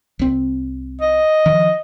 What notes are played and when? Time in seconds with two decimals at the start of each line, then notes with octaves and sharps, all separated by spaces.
0.19 C2 C4
1.01 D#5
1.46 D#3 F3